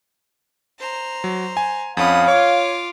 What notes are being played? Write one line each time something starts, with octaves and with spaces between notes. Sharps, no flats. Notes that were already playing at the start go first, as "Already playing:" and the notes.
C5 A#5
F#3
G#5
F2 C#4 F5 F#5 B5 D#6
F4 C#5 D6